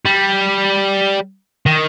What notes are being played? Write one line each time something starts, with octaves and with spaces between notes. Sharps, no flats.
G3
D#3